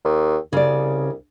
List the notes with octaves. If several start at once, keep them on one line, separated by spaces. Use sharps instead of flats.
D#2
C2 C#3 D5